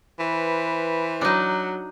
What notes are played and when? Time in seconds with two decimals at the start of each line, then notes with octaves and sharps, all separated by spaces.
0.19 E3 B4 C5
1.21 F#3 D4 D#4